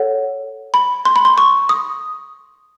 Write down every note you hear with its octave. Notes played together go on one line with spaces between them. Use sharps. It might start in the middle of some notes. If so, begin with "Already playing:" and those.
Already playing: A4 C#5 F#5
B5
C6
B5
C6
C#6
D#6